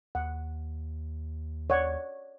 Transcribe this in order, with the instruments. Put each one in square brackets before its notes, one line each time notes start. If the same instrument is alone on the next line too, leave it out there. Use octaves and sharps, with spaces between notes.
[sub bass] D#2 [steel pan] F#5
[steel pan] C#5 D5 F#5